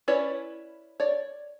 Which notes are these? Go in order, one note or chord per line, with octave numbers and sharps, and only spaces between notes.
C#4 E4 B4 C#5 D5
C#5 D5